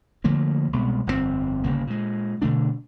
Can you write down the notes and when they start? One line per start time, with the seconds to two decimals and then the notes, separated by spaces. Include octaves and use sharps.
0.24 D3 F3 A3 A#3
0.73 C2 B2 G#3 B3
1.07 G1 F2 C3 C4
1.64 G1 D2 C#3 A#3
1.87 A#2 G#3
2.42 B2 D3 A3 D4